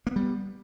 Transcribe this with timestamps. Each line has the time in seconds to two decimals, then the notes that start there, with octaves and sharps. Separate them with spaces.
0.07 A#3
0.11 B3
0.16 G3